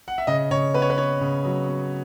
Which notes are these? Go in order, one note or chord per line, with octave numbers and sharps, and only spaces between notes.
F#5
E5
C#3 D#5
C#3 C#5
B3 B4
C#5
B4
B3 C#5
C#3
F#3
B3